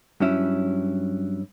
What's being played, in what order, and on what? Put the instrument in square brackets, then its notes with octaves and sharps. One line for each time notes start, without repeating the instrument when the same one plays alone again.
[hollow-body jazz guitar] G2 F#3 C#4 E4